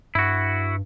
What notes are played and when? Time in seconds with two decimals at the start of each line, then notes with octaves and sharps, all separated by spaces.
0.15 G2 E4 F#4